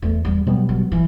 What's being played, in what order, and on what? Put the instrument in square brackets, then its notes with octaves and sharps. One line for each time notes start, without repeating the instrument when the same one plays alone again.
[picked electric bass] E2 [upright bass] A3
[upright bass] G3
[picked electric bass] B2 G3 B3 [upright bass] F#3
[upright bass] F#3
E3